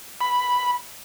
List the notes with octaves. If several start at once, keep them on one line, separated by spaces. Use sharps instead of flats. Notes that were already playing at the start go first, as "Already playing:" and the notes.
B5